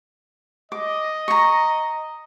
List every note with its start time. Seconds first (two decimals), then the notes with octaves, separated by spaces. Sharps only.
0.72 D#5 D6
1.28 A#5 C#6